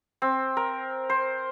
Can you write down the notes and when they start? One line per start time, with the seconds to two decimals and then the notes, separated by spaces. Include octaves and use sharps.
0.22 C4
0.57 A#4
1.10 C5